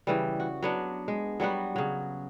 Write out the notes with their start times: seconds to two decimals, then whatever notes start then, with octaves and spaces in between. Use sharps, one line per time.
0.07 C#3 E3 G3
0.40 F#4
0.62 F#3 B3 D4
1.08 G#3
1.40 F#3 G3 B3 F#4
1.76 C#3 F#3